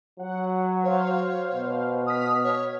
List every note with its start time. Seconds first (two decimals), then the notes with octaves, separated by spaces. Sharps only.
0.19 F#3 F#5
0.84 C5 C#5 F5
1.54 B2
2.07 D#6 F6 B6
2.44 C#5